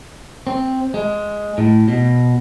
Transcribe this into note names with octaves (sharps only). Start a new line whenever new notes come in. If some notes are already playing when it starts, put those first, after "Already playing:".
C4
G#3
A2
B2